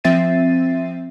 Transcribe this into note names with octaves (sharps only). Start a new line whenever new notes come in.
F3 C4 E5 A6 C7 D#7